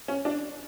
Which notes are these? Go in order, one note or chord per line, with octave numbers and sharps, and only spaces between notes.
C#4
D4